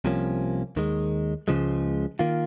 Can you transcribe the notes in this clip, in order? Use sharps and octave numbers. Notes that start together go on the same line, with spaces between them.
C2 C3 F3 A#3 C#4
D#2 D#3 G#3
C#2 C#3 F3 G#3
D#3 A#3 F4